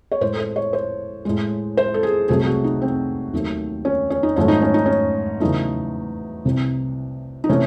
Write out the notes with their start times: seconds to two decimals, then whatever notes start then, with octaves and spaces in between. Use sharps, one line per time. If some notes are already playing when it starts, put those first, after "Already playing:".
0.12 C#5
0.21 A2 G#3 C5
0.33 A4
0.39 C5
0.56 C#5
0.73 C5
1.25 A2 G#3
1.77 C5
1.94 A4
2.03 G#4
2.28 C2 C3 F#3 A3 G#4
2.39 G#4
2.46 F#4
2.64 D#4
2.82 C4
3.34 D#2 D#3 F#3 A3
3.85 C#4
4.10 C#4
4.23 D#4
4.36 G#2 D#3 F#3 A3 C#4
4.48 D#4
4.61 C#4
4.74 D#4
4.86 C#4
5.40 E2 C#3 F#3 A3 D#4
6.45 C2 C3 E3
7.44 D#4
7.49 C3 E3 A3 C#4